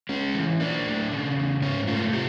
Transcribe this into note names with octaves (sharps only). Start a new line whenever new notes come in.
G#3 C#4
E3
A#3 D4
A2
C#3
E2
G#2 C#4
A3 F4
C3 G4